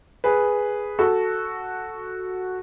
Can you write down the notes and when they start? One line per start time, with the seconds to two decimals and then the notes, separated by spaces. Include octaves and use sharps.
0.24 G#4 B4
0.99 F#4 A4